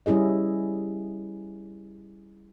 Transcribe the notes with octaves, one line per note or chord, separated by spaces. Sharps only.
G3 C#4 E4 G#4 D#5